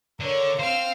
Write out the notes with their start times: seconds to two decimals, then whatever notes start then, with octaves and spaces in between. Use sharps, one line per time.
0.20 D3 A#4 C#5
0.59 C5 F5 G5 F6